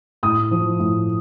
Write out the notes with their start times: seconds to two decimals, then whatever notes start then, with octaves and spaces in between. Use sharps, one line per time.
0.23 A2 D#6
0.51 F3
0.80 A2